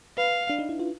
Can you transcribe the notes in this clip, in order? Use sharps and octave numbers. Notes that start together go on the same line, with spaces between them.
B4 F5
D4
D#4
E4
F4